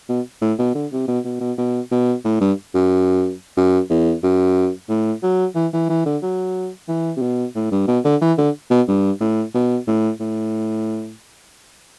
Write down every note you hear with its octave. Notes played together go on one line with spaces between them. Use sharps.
B2
A2
B2
D3
C3
B2
B2
B2
B2
B2
A2
G2
F#2
F#2
E2
F#2
A2
F#3
E3
E3
E3
D3
F#3
E3
C3
B2
A2
G2
B2
D3
E3
D3
B2
G2
A2
B2
A2
A2